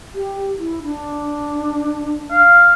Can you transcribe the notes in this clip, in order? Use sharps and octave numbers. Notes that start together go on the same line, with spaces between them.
G4
E4
D4
F5